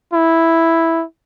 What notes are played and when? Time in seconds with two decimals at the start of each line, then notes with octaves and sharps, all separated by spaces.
0.13 E4